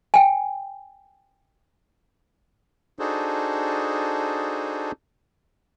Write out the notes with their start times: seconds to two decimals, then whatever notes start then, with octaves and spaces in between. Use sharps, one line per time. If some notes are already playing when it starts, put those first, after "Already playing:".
0.14 G5 G#5
2.99 D4 D#4 F#4 G#4 A4 C5